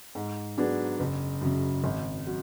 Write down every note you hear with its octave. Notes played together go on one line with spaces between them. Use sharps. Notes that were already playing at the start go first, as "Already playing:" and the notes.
G#2
F#3 B3 D4 G#4
F#1
F#2 C#3
G#1
F#3